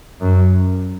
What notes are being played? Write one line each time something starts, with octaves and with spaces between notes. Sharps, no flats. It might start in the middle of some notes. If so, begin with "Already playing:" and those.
F#2